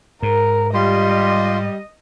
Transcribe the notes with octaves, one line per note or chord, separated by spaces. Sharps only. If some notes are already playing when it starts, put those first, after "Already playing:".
G#2 A#4
G3 F4 D#5 C6